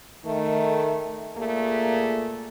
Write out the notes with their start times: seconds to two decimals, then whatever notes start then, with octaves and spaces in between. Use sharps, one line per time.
0.24 D#3 A3
1.36 A#2 A3 A#3 G#4